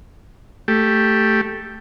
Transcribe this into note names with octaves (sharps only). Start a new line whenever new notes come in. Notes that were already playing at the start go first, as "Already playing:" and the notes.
A3 G4